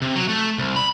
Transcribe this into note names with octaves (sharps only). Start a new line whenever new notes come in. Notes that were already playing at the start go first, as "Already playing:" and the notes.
C3
F#3
A3
C2
B5